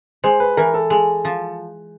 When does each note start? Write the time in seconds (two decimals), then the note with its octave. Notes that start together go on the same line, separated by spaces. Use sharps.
0.24 G#3 C5
0.40 B4
0.57 E3 A#4
0.74 A4
0.90 G#3
1.25 F3